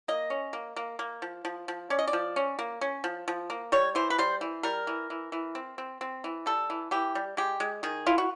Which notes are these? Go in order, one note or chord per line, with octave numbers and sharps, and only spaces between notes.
A#3 D#5
C#4
A#3
A#3
A#3
F3
F3
F3
C#4 D5
D#5
D5
F3
C#4
A#3
C#4
F3
F3
A#3
G3 C#5
E3 C5
B4
G3 C5
E3
G3 A#4
E3
E3
E3
C4
C4
C4
E3
G3 A4
E3
E3 G4
G3
G#3 G4
G#3
D#3 G#4
E4 F4
F#4